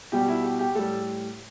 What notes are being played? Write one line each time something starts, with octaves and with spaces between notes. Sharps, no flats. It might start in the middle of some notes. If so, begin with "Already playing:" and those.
B2 G3 G4
E4
G4
G4
A2 G3 A4